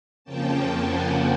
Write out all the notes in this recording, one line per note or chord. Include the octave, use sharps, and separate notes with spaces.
F2 C#3 F3 A#3 C#4 G5 A5
F#5 G#5